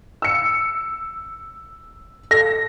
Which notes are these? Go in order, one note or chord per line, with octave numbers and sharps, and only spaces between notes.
E6 C#7
A4 A#6